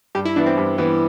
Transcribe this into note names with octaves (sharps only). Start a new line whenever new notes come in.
G2 G4
E4
E3 B3 D4 E4
C4
G2
E3 B3 E4